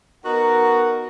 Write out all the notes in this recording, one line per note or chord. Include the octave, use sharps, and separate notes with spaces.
B3 D#4 F#4 A#4 F#5